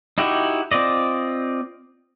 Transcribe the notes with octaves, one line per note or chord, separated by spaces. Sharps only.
D#4 E4 F#4 G4
C4 F4 D5 D#5